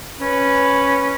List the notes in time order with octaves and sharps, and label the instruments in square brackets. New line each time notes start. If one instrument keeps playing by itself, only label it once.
[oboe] C#4 [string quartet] B4